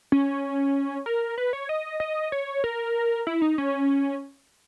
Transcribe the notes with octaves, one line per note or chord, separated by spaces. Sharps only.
C#4
A#4
B4
C#5
D#5
D#5
C#5
A#4
E4
D#4
C#4